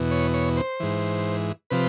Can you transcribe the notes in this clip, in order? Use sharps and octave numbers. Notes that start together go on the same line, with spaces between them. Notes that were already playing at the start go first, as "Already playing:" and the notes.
Already playing: E2 B2
C#5
C#5
C5
G#2 E3
C3 F3 B4